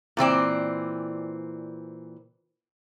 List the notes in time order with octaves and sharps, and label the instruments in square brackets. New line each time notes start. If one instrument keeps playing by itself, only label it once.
[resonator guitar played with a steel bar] A#2 E3 C4 D5